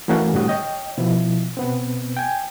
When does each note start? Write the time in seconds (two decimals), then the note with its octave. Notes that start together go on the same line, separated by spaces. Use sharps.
0.08 E3 A3 A#3 C#4 F#4
0.34 A2 D3 G3 C4 F#4 D#6
0.48 C#5 D#5 G5
0.98 B2 F3 E4
1.57 B2 B3 C4
2.17 G5 G#5